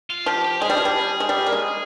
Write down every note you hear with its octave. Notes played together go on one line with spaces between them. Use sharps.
F4
F3 G4
G4
G#3 G#4
G3
F3
G3
G#3
G3
A#3
G#3